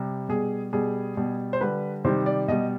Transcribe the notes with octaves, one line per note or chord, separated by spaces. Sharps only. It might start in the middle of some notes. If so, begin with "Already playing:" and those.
Already playing: C3 G3
B2 G3 G#4
B2 G3 G#4
B2 G3
C5
D3 G3 B4
C3 D#3 G3 C5
D5
B2 G3 D#5